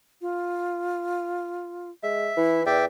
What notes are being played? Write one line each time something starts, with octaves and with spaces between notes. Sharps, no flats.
F4
G#3 E5
E3 E4
E2 B4 D5 E5 G5